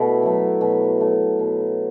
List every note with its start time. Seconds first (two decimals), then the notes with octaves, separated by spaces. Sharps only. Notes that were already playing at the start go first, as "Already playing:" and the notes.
Already playing: B2 A3 E4
0.23 F#3 A3
0.61 B2
1.01 F#3 A3
1.39 B2